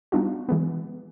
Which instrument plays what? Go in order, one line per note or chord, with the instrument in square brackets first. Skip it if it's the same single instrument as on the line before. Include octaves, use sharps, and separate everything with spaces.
[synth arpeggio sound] G3 B3 D4 D#4 F4 F#4
E3 G#3 B3